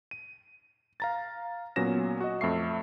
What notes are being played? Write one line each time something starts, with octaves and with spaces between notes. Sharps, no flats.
D#7
F5 A#5 A6
A#2 F#3 B3 C#4 A#6 E7
F#4 D#5
F2 A3 E5 C#6 C7